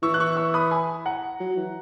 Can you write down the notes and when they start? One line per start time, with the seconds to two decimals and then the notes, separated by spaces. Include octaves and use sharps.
0.03 E3 C#6 E6
0.14 F#6
0.20 C#6 E6
0.37 C#6 E6
0.54 B5 D#6
0.71 G#5 B5
1.05 F#5 A#5
1.40 F#3
1.57 E3